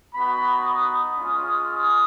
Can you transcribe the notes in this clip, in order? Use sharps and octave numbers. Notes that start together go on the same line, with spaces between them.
B3 D#4 F#4 B5
D#6
G#3 C#4 F4
D#6